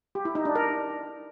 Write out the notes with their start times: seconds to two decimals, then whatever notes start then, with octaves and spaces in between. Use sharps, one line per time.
0.15 G4
0.25 E4
0.35 D#4
0.45 D4
0.55 A#4